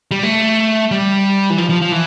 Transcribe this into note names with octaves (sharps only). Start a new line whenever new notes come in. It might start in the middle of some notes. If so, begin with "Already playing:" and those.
G3
A3
G3
E3
F3
F3
F3
E3